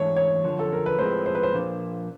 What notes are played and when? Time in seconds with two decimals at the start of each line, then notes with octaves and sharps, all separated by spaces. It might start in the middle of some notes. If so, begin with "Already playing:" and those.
Already playing: G#2 E3 A3 D4 C#5
0.16 C#5
0.44 F#2 D3 F3
0.59 A4
0.73 A#4
0.86 B4
0.99 A2 F3 G#3 C4 C5
1.26 C5
1.35 B4
1.43 C5
1.54 A#2 F3 A#3 D4